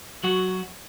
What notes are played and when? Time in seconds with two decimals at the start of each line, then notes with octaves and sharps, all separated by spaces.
0.24 F#3 F#4